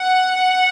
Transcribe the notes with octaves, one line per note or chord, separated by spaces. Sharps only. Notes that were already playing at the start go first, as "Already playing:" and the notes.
Already playing: F#5